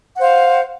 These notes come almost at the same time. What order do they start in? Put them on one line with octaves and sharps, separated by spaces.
F#5 C5 F5